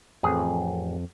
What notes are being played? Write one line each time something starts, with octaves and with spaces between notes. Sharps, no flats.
A1 F2 G#4